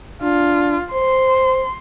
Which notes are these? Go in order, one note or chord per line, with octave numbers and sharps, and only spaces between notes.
D4 F4
C5 C6